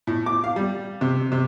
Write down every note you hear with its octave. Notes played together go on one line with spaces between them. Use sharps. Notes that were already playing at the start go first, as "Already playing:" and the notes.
A2
D6
F5
G3
C3
C3